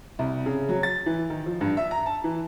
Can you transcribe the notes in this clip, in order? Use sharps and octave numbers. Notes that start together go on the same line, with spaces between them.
C2
C#3
F#3
A6
E3
D#3
F3
G2
E5
A#5
A5
E3